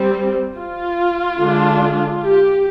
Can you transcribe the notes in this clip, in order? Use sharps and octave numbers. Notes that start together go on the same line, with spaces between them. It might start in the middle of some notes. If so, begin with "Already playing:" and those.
Already playing: G3 C4
F4
D3 G#3 D4
G4